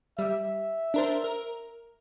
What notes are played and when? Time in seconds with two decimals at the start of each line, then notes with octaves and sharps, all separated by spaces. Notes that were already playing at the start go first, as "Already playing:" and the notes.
0.19 G3 E5
0.94 D4 A#4 C5
1.24 A#4